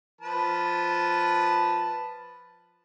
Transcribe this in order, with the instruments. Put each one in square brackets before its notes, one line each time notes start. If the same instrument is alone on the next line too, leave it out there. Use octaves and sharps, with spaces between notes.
[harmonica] F3 B4 A5